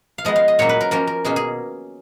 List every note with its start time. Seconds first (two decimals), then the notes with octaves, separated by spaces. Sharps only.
0.18 F5
0.25 F3 G#3 B3 D#5
0.36 F5
0.48 D#5
0.59 A#2 F#3 A#3 C#4 C#5
0.69 B4
0.81 A#4
0.91 F3 A#3 C#4 A#4
1.07 A#4
1.25 B2 A#3 C#4 G#4
1.36 G#4